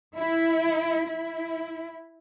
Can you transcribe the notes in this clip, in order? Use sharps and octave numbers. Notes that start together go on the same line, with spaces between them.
E4
E4